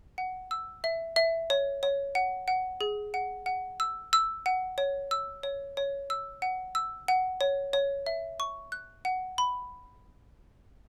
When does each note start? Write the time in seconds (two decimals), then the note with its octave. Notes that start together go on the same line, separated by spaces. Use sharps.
0.18 F#5
0.51 E6
0.84 E5
1.16 E5
1.50 C#5
1.83 C#5
2.15 F#5
2.48 F#5
2.81 G#4
3.14 F#5
3.46 F#5
3.80 E6
4.13 E6
4.46 F#5
4.78 C#5
5.11 E6
5.43 C#5
5.77 C#5
6.10 E6
6.42 F#5
6.75 E6
7.08 F#5
7.41 C#5
7.73 C#5
8.06 E5
8.40 C#6
8.72 F#6
9.05 F#5
9.38 B5